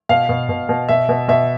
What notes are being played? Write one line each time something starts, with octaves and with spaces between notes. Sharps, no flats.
B2 F5
B2
B2
B2
B2 E5
B2
B2 E5